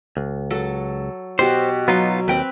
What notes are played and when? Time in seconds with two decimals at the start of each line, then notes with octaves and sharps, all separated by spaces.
0.17 C#2
0.50 F#3 A4
1.39 B2 F#4 G4 C5
1.88 F#3 B3 D#4 F4
2.28 D#2 C4 B4 G5